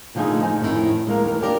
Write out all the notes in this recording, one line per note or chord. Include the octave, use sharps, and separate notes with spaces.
A#2 D3 F3 A3 D#4 G#4
D#4 G#5
F2 A2 D3 D#3 E4
G#3 A#3 A#4
D#2 E3 A#4
D4 F4 G4 A#4 D5